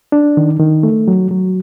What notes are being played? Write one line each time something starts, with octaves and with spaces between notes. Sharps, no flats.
D4
D#3
D#3
A3
F#3
F#3